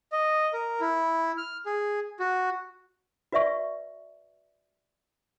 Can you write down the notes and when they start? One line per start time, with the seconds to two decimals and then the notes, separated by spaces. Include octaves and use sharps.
0.12 D#5
0.53 A#4
0.81 E4
1.38 F6
1.66 G#4
2.20 F#4
3.32 F#4 B4 D5 E5 C#6